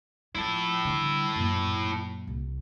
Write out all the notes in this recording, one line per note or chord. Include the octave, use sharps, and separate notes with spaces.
F3 E4 A4
D3 G3
F#2 A#2
C2